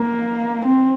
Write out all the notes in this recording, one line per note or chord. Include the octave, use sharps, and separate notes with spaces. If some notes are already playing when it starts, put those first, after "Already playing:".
Already playing: A#3
C4